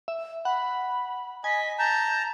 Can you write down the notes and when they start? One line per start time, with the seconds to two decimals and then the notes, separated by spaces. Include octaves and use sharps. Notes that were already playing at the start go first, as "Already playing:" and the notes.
0.08 E5
0.45 F#5 B5
1.44 D#5 G#5 B6
1.79 A5 A#5 G6